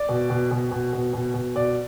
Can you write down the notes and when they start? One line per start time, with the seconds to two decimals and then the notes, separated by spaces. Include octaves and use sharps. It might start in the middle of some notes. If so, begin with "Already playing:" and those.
Already playing: D5
0.09 B2
0.30 B2
0.51 B2
0.71 B2
0.93 B2
1.13 B2
1.34 B2
1.55 B2 D5